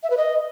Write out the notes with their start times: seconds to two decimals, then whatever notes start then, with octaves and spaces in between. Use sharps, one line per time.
0.03 E5
0.10 B4
0.17 D#5